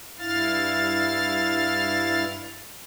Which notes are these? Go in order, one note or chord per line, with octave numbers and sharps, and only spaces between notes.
G2 E4 F5 F6 A6